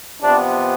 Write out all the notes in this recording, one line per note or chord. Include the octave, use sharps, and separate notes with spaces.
C3 F3 B3 D4